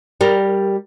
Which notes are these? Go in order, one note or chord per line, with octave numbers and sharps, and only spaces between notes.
G3 A#4